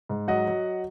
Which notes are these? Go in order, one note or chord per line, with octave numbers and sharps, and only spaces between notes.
G#2
F#3 D#5 F#5
F#3